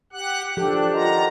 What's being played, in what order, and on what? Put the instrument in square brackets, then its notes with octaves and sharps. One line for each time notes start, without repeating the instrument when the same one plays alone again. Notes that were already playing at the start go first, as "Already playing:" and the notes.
[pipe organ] G4 F#5 F#6
[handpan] F3 G4 A4 [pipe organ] D4
[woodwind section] D3 D#3 F4 [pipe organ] A#5